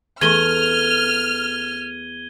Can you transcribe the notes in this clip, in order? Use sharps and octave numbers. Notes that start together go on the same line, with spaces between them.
E2 A3 G#5 F6 G#6 D#7 G7